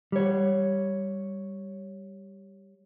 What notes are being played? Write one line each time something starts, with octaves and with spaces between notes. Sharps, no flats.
G3 C#5